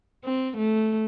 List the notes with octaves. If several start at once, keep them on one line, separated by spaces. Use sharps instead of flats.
C4
A3